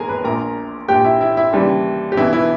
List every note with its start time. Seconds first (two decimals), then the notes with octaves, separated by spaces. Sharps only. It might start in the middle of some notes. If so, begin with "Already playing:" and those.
Already playing: E1 D#2 G#4 A#4 G#5 A#5
0.09 B4 B5
0.24 A#1 A#2 A#4 A#5
0.88 A#1 A#2 G4 G5
1.00 G5
1.04 E4 E5
1.21 E4 E5
1.37 E4 E5
1.53 D#2 C#3 E3 G3 G4
2.12 G4
2.17 B1 B2 E3 E4
2.33 E3 E4